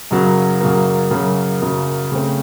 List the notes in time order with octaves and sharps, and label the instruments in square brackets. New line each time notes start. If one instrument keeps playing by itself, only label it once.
[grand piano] F#2 C#3 F#3 A#3
F#2 C#3 F#3 A#3
F#2 C#3 F#3 A#3
F#2 C#3 F#3 A#3
C#3 A3 C4